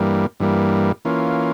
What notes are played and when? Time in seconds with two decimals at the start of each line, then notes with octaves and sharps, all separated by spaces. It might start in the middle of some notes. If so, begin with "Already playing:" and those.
Already playing: G2 E3 G3 A#3
0.40 G2 E3 G3 A#3
1.05 E3 A#3 C#4 F4